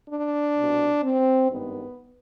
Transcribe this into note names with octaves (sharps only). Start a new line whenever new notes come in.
D4
C2 B2
C4
G#1 G2 D#3 B3